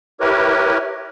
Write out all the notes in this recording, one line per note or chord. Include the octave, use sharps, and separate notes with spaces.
E4 G4 A#4 B4 C#5